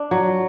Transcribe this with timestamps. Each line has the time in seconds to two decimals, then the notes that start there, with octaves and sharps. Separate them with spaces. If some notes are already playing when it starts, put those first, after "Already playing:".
Already playing: D4
0.11 F#3